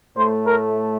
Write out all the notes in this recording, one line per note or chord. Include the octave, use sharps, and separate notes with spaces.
A2 A3 C5
A#4